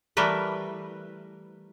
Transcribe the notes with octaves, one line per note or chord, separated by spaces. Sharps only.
E3 G3 A3 A#4 B4